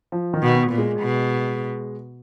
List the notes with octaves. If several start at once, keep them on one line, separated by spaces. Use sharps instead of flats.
F3
D#3
B2
B3
A#2
G#3
B2